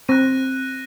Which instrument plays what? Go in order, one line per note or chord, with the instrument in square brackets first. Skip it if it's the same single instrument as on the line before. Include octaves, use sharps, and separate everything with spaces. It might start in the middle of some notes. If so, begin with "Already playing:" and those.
[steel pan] C4 [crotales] F#6 A#6 D#7